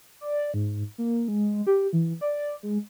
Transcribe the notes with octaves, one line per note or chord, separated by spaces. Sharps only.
D5
G#2
A#3
G#3
G4
E3
D5
G#3